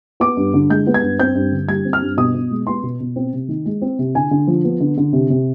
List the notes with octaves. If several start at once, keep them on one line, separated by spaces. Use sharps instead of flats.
B3 D6
G2
D3
G#3 G6
B3
G#6
G2
C4 G6
G2
D3
G3 G#6
C4
F6
G2
B2 D#6
B2
G#3
B3 C6
B2
B2
C4
C3
D#3
G#3
C4
C3
D3 G#5
D3
F3
B3
D3
D3
C3
C3